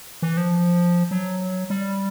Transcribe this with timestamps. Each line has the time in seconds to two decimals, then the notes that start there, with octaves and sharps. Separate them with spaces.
0.22 E3
0.37 F3
1.11 F#3
1.70 G3